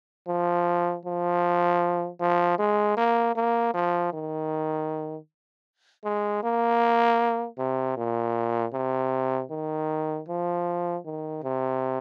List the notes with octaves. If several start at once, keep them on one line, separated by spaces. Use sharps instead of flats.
F3
F3
F3
G#3
A#3
A#3
F3
D#3
G#3
A#3
C3
A#2
C3
D#3
F3
D#3
C3